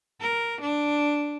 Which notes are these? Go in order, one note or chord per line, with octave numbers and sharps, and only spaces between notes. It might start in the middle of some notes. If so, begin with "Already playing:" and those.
A#4
D4